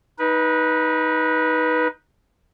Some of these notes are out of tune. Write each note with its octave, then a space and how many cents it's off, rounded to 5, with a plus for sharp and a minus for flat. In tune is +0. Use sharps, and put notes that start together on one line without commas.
D#4 +15 B4 -15